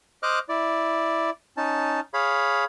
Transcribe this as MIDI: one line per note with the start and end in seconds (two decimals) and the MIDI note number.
0.23 0.39 72
0.23 0.39 75
0.23 0.39 86
0.23 0.39 89
0.23 0.39 90
0.49 1.30 64
0.49 1.30 74
1.57 2.00 61
1.57 2.00 63
1.57 2.00 81
2.14 2.65 68
2.14 2.65 73
2.14 2.65 77
2.14 2.65 83